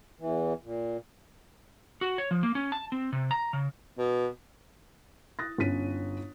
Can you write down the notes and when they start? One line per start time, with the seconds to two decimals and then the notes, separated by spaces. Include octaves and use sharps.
0.20 E2 E3
0.63 A#2
2.01 F#4
2.18 C#5
2.31 F3
2.43 A#3
2.55 C#4
2.72 A5
2.92 C4
3.12 C3
3.31 A#5
3.53 C#3
3.98 B2
5.39 D#6 F#6 A6 A#6
5.58 G1 C#4 E4 B6 D#7